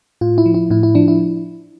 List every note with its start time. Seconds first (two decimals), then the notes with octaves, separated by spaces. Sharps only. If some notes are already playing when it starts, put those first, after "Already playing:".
0.21 A2 F4
0.38 E4
0.46 F3
0.54 E4
0.70 A2 E4
0.83 E4
0.95 F3 D4
1.08 E4